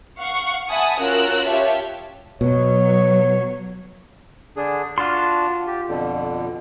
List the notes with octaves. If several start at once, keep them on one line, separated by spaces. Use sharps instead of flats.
F5 F#5 C#6
E5 F#5 G#5 A5 B5 D#6
C#4 F4 F#4 A#4 E6 F#6
F4 G4 C#5 E5 A5
B2 F#3 C#5
D3 D4 G#4
D4 F4 F#4 A5 C6
G4
F2 B2 D3